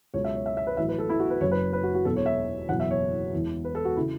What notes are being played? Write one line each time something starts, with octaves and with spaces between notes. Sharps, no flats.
C#2 B2 F#3 C#5
E5
C#5
E5
E5
B4
A1 A2 F#3 E5
B4
A4
E4
F#4
B4
F#1 F#2 F#3 C#5
B4
B4
F#4
F#4
E1 E2 B2 F#3 A4
C#5
E5
F#1 E2 B2 F#3 F#5
E5
C#5
E1 E2 E3
B4
A4
F#4
C#3 E3 E4